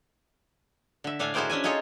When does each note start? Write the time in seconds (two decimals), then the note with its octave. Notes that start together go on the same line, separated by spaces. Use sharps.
1.04 D3 E5
1.19 A2 D4 A4 F5 G#5
1.34 E4 F#4 G#4 A#4 C5 D5
1.50 C#4 D4 E5 G#5
1.64 D#4 F4 G#4 A4 C#5 D#5